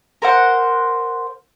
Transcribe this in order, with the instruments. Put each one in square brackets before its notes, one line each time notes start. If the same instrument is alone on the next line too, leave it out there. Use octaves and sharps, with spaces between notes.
[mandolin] A#4 C5 F#5